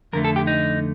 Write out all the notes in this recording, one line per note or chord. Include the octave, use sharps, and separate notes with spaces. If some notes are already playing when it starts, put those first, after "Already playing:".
F2 D3 A3 A#4
A4
G4
D#4